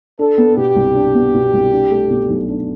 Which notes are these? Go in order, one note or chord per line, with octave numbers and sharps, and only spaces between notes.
D4 A4
B3
B2 G4
C2
D4
B3
B2
C2
D4
A3
B2
B1
D4